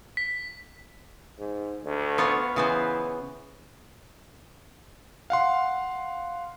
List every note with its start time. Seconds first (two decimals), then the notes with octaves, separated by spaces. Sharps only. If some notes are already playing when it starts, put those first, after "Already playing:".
0.17 B6
1.38 G#2
1.83 D2
2.18 B3 F4 C#5
2.56 C#3 E3 B3 C5
5.30 F5 F#5 C6